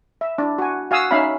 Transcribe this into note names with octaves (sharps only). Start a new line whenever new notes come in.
E5
D4 E4
F#4 G#5
F#4 F5 G#5 D#6 E6
C#4 D#4 E5 F5 B5